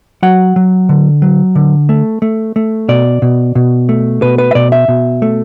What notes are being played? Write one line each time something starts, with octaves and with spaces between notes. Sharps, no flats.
F#3 F#5
F#3
D3
F#3
D3
A3
A3
A3
B2 D5
B2
B2
A3
B2 B4
B4
E5
B2 D5
E5
B2
A3